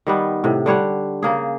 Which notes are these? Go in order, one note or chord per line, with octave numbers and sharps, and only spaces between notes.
D#3 G3 B3
A2 C3
D3 G3 C#5 F#5
C#3 A#3 G#4